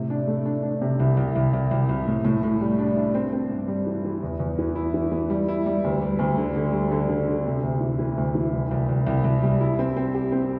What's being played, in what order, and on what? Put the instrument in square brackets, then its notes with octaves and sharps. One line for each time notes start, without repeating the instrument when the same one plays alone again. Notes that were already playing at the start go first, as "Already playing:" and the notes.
Already playing: [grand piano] A2 C3
D4
A3
D4
D4
C3
C2
C2
C2
C2
C2
C2
A2
A2
A2
G3
D4
D4
C4
C4
G2
G3
E3
E3
E2
E2
E3
E4
E3
E3
G3
E4
G3
D2
G3
D2
D3
D3
G3
D3
D3
D3
C3
D2
E3
E3
D2
E3
C2
C2
C2
C2
C2
G3
E4
C4
C4
G4
C4